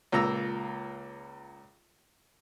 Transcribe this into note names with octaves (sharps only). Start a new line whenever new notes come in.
C#2 A#2 A#5 E6